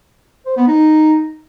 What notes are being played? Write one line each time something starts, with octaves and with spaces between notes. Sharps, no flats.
C5
B3
D#4